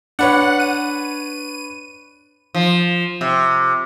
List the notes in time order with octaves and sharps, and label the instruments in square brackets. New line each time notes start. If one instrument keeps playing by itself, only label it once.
[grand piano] D4 B4 C#5 [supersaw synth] F#5
[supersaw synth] D#7
[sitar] F3
C3